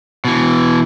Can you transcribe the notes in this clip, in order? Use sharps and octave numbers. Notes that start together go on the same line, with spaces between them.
B2 E3